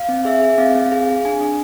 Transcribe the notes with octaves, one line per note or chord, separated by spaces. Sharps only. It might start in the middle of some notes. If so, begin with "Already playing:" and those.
Already playing: F5
C4
G#4 E5
G#4
C4 F5
C4
G#4
G#4
D4 G#5
D4